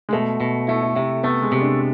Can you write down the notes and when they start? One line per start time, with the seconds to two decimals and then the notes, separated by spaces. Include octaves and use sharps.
0.09 G#3
0.13 B2 A3
0.40 B2
0.68 A3 E4
0.83 E4
0.96 C3 E4
1.24 A3 B3
1.42 G#3
1.52 C3
1.61 D4